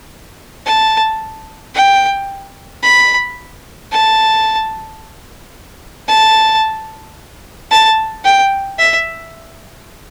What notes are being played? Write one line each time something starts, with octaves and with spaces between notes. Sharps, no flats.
A5
G5
B5
A5
A5
A5
G5
E5